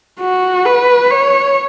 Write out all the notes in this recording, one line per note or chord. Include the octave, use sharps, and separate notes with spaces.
F#4
B4
C#5